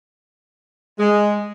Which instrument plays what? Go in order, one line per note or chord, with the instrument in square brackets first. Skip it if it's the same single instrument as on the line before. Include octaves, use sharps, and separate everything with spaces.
[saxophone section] G#3